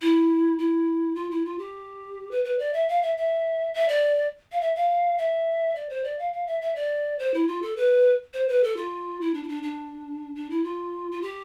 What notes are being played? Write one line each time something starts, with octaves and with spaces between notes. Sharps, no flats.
E4
E4
F4
E4
F4
G4
B4
B4
D5
E5
F5
E5
E5
E5
D5
F5
E5
F5
E5
D5
C5
D5
F5
F5
E5
E5
D5
C5
E4
F4
A4
B4
C5
B4
A4
F4
E4
D4
E4
D4
D4
D4
E4
F4
F4
G4